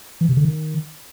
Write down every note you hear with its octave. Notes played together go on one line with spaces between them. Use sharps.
E3
C3
D3
D#3